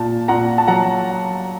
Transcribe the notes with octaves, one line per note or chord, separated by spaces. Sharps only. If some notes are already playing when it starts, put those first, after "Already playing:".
Already playing: A#2 A5
A#2 F#5 A#5
A5
F#3 F#5 A#5